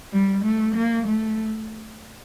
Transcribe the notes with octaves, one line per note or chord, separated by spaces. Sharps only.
G3
A3
A#3
A3